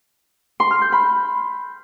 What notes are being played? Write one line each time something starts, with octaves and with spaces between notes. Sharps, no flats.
C6
F6
G6
B5